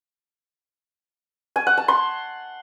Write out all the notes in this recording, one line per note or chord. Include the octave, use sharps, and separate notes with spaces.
G#5
F#5
A5
C6